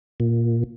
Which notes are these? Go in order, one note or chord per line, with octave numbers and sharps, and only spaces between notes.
A#2